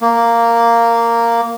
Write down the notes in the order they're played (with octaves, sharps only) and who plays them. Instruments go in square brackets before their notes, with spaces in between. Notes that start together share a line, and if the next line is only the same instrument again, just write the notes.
[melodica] A#3